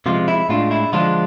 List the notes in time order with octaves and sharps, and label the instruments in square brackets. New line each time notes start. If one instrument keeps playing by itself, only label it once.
[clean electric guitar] C3 F3 G#3 F4
E4
A2 G#3 D4 F4
E4
D3 F3 G#3 D4 F4